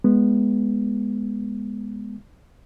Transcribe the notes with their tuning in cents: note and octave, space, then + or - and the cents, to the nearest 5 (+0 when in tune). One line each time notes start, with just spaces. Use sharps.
G#3 +0 B3 -5